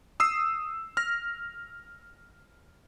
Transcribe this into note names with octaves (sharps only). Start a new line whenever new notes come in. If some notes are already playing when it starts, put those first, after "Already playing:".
D#6 E6 C7
F6 A#6